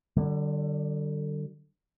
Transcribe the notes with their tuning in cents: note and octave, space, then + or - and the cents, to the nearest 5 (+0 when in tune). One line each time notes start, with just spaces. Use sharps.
D3 +25 G3 -35